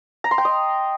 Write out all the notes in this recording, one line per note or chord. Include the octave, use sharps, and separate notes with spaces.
A#5
C6
G5
D#5